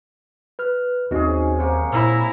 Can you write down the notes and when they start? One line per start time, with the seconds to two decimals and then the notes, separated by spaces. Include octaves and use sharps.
0.59 B4 F6
1.11 D#2 C3 C4 C#4 D#4 F#4 G#4 D#5
1.59 C3 F#3 A#3 C5
1.93 A#2 E4 A#5